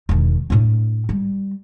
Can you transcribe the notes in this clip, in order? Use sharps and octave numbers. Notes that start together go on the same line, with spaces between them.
E1 D#3
A2 D4
G3